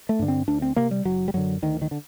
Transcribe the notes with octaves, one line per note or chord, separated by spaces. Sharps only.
A3
G2 D3
C4
D2 D4
C4
C3 A#3
G3
F#1 F#3
G3
F#2 D3 F#3
D2 D#3
D#3
D3